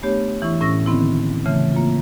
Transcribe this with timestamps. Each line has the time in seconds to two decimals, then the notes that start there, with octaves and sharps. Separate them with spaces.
0.03 A3 B3 D4 G4 C#5
0.42 E3 E4 C#6
0.61 A2 C#4 E6 A#6
0.86 D3 D#3 B3 C4 E4
1.45 C#3 E3 A3
1.73 A#3 F4